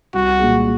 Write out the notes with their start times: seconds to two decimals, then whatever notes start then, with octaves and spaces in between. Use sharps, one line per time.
0.14 C2 F#4
0.39 A#2 G#3